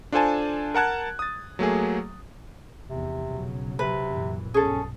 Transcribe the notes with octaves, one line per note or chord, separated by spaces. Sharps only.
D4 F4 A4 C5 G#5 A5
A#4 F#5 A5 F#6 G#6
D#6 A6
F#3 A3 A#3 G#4
F1 E2 C3
B1 C#3 F#3
C3 B4
F#2 A#2 E3
B1 G2 C#4 G#4 A4